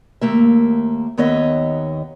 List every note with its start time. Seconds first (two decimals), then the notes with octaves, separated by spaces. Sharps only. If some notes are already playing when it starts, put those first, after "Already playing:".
0.21 D#2 A3 A#3 E5
1.18 D#2 D#3 B3 C#5 D#5 E5